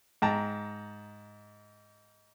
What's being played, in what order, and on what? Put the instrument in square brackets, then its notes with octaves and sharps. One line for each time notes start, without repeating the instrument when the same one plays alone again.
[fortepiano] G#2 G5 A5 A#5